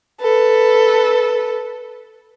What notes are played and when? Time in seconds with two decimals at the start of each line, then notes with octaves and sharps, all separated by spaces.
0.21 A4 B4